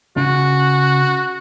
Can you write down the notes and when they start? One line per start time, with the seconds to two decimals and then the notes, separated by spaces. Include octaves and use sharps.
0.17 C#3 F#4